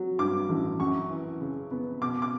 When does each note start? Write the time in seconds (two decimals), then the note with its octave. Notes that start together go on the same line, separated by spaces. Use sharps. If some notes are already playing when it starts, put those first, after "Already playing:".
Already playing: F#3
0.19 G2 D6
0.49 A1
0.80 F#2 C#6
1.10 E3
1.41 C#3
1.71 B3
2.02 B2 D6
2.22 D6